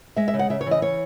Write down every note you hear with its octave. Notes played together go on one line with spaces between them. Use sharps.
G#3 E5
E5
C#3
F#5
C#3 E5
C#5
E3
D#5
C#3 C#5